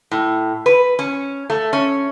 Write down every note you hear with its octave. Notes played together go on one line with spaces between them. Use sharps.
A2
B4
C#4
A3
C#4